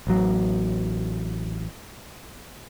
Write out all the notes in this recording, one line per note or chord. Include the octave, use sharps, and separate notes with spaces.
A1 F#3